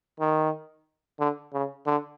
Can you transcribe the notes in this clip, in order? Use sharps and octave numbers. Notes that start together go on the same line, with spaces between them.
D#3
D3
C#3
D3